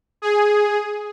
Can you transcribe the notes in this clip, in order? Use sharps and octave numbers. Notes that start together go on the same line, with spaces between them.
G#4